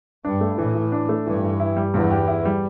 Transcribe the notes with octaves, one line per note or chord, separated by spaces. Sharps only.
G2 D4
A3
A2 E3
E3
D4
A3
G2 E3
E3
E4
G3
E2 G2
G4
E4
G3